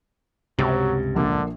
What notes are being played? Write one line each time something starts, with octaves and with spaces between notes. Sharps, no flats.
C#2 G2 C3 F#3 G4
A#1 D3 A#3 D4